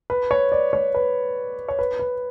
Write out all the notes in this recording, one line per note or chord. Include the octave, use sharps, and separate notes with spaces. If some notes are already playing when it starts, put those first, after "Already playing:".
B4
C#5
D5
C#5
B4
C#5
B4
B4